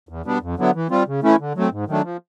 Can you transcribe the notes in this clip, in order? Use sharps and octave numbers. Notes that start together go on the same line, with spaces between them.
E2
B2 G3 B3 D4
F2
D3 F#3 B3 E4
E3
G3 C4 F4
C#3
E3 A3 C#4 E4
D3
F#3 A3 C4
G#2
D#3 F#3 A3 D4
F3